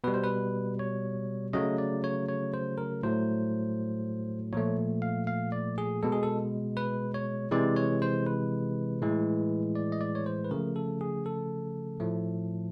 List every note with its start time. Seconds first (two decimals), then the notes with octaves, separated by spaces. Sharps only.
0.04 B2 G3 B4
0.14 C5
0.23 B4
0.79 C#5
1.53 C#3 F#3 A3 D#5
1.78 D5
2.04 C#5
2.29 C#5
2.54 C5
2.78 A#4
3.03 A2 F#3 A3 C5
4.53 A#2 F3 A3 C#5
5.02 F5
5.27 F5
5.52 D5
5.78 G#4
6.03 B2 G#3 A4
6.12 G#4
6.23 A4
6.77 B4
7.14 C#5
7.51 C3 E3 G#3 D5
7.76 C#5
8.02 C5
8.27 B4
9.02 A2 E3 G#3
9.75 D5
9.92 D#5
10.01 D5
10.15 C#5
10.26 C5
10.44 B4
10.51 C#3 F3 A3 A#4
10.76 A4
11.01 G#4
11.26 A4
12.00 A2 F3 A3